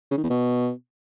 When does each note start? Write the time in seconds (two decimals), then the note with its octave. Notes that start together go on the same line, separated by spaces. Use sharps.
0.11 C#3
0.17 D#3
0.24 E2
0.30 B2